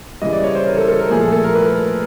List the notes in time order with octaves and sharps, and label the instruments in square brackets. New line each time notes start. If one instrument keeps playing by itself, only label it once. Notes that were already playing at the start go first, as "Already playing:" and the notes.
[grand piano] C#3 E3 G3 D#5
D5
C#5
C5
A#4
A4
A4
A#4
A#2 F3 A3 G#4
A4
A4
A#4
B4